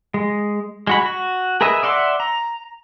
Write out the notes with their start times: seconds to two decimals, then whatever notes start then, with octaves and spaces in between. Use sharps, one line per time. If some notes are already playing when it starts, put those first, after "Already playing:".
0.14 G#3
0.87 G#3 F#4 B5
1.06 F#4
1.61 G#4 A#4 B4 D#5 E5
1.83 D5 E5 F#5 C6 D6
2.20 A#5